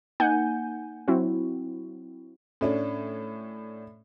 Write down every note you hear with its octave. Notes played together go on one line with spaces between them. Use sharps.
A#3 D#4 F#5 G#5 G6
F#3 C4 E4 F#4
A2 C#4 D4